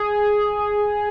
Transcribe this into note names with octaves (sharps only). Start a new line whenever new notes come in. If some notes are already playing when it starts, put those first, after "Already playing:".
Already playing: G#4